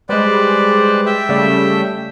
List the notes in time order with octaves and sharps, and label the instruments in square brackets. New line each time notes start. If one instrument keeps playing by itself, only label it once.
[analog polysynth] G3 G#3 [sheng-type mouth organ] B4 C5 D5
[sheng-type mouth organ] E5 G5
[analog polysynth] C#3 G3 A3